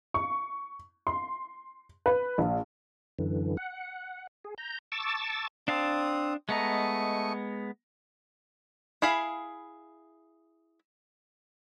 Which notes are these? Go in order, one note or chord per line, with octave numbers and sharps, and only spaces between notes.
C#6
C6
B4
A#1
F#2 D3 E3
F#5
G#4
A#5 G6
A5 C#6 D6 E6 A6
C4 D4 F5 A5 D#6
G#3 A3 B3 D#5 A#5 C#6
E4 G#4 F5 B5